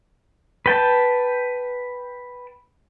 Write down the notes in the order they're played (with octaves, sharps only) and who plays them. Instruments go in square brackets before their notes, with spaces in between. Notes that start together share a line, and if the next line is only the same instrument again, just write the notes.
[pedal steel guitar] B4 G5 A5